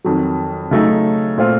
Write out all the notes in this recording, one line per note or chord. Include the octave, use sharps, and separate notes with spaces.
F2 D#3 F#3
C#3 F#3 A3 D#4
A#2 A3 C4 F4